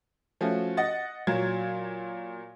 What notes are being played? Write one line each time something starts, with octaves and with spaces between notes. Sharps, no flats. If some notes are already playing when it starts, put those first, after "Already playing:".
F3 A3 C#4 F#4
D#5 F#5 A6
A#2 F#3 G#6